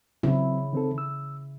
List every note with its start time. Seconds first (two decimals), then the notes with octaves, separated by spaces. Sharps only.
0.23 C#3 F#3 C4 E4
0.73 D#3 C4 A4
0.98 E6